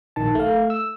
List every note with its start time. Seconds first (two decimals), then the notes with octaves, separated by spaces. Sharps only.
0.16 A#1 D#3 A5
0.35 A3 F5
0.70 E6